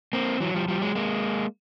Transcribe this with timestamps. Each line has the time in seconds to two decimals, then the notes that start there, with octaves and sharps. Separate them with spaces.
0.13 A#3 C4
0.40 E3 F#3
0.55 F3 G3
0.68 F3 G3
0.82 F#3 G#3
0.95 G#3 A#3